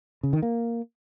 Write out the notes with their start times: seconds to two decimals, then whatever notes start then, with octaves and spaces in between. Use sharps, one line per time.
0.23 C#3
0.33 D#3
0.43 A#3